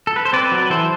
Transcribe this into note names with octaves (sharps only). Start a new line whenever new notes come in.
A4
B4
C5
C4 B4 D5
F#3
B4
E3 A4 C5